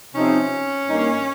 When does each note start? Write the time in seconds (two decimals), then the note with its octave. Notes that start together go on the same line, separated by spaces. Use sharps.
0.14 C3 F3 C4 C#4 D#4
0.86 G2 D#3 A#3 D#4